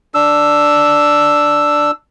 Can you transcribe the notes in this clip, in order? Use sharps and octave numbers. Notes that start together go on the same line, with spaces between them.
D4 E6